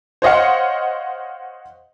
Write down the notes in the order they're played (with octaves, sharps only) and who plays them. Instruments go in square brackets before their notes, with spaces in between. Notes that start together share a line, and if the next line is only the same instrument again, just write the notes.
[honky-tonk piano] C5 C#5 D#5 F5 F#5